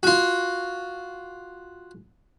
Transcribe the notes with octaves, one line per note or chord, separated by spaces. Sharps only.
F4 F#4